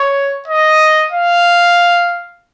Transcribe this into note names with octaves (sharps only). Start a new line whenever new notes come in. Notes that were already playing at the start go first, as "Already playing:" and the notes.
Already playing: C#5
D#5
F5